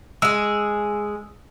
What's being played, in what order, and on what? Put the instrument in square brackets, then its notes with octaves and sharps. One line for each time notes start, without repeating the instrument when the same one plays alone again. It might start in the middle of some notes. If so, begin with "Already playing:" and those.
[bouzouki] G#3 G#4 [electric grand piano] E6